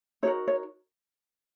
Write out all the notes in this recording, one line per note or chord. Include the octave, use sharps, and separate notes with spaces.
D#4 F#4 A#4 C#5
C#5